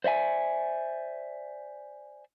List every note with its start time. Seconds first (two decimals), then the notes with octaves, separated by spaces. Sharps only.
0.04 C5 D5 E5 G#5